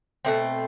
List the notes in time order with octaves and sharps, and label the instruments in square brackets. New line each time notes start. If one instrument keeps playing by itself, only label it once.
[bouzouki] B2 A3 C4